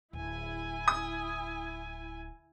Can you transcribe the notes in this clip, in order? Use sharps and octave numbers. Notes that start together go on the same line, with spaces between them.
D1 E4 G#5
D#6